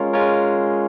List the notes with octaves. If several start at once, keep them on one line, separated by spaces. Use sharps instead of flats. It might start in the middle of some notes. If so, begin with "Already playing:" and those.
Already playing: G#3 C#4 F4 A#4 C#5
G#3 C#4 F4 A#4 C#5